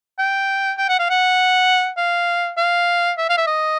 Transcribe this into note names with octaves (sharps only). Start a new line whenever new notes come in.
G5
G5
F#5
F5
F#5
F5
F5
E5
F5
E5
D#5